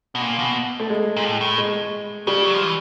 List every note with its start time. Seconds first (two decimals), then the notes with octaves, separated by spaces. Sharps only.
0.15 B2
0.21 A#2
0.39 B2
0.80 A3
0.90 G#3
1.16 A#2
1.25 A2
1.41 A2
1.58 G#3
2.27 C#3 G3
2.46 F#3
2.54 F3
2.62 E3